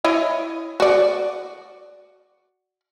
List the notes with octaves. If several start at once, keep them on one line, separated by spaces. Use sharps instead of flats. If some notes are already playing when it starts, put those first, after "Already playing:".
E4 C#5 D#5
F#4 D5